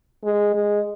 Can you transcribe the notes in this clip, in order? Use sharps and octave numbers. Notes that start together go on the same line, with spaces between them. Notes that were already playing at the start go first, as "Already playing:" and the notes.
G#3
G#3